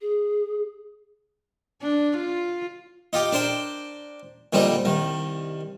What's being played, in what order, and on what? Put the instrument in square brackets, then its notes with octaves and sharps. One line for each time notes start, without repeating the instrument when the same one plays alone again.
[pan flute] G#4
[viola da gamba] D4
F4
[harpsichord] D#4 F4 G4
D4 A#4 C5 G5
A#2 D3 G3 C4 D#4
C2 D#3